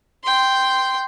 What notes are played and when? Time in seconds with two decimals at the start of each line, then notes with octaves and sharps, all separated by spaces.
0.23 G5 C6